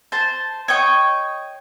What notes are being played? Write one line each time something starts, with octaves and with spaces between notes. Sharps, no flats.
C5 A5
C#5 D#5 G5 C#6